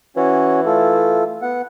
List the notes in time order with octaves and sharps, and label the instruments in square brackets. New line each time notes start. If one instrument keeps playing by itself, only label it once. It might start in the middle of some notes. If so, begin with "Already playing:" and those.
[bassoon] E3 [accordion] C#4 F#4 C#5
[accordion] A3 F4 A4
B3 F#5